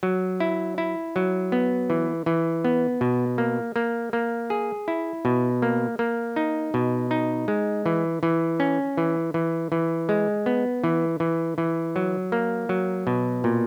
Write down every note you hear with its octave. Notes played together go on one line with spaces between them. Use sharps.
F#3
E4
E4
F#3
B3
E3
E3
B3
B2
A#3
A#3
A#3
G#4
E4
B2
A#3
A#3
D#4
B2
D#4
G#3
E3
E3
C#4
E3
E3
E3
G#3
B3
E3
E3
E3
F#3
A#3
F#3
B2
A#2